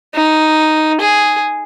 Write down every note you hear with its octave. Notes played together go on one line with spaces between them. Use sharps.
D#4
G#4